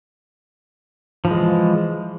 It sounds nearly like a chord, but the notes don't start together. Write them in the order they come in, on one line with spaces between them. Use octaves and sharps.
F3 E3 G#3